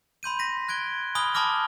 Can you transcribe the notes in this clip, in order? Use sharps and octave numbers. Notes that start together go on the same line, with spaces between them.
B5 C6 G6 D#7
A#6 B6 D#7
F#6 G#6 D7 G7
G#5 B5 D#6 F6 G7
G#5 A5 B5 D6 F6 A#6